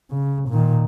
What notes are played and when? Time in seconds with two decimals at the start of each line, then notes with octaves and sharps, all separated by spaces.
0.11 C#3
0.49 A#2 D#3